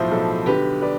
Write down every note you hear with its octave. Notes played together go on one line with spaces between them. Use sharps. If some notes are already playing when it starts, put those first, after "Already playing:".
Already playing: B1 A2 F3 C5 E5
B1 A4
D3 G4 B4
B4 D5